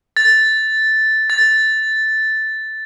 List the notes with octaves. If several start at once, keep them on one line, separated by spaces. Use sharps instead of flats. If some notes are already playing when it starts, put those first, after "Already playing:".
A6
A6